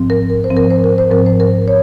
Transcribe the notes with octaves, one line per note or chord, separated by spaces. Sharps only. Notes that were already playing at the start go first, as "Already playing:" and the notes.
Already playing: G#2 F3 C4
A#4
A#4
C5
G#2 F3 C4
A#4
C5
A#4
C5
G#2 F3 C4 A#4
C5
A#4
C#5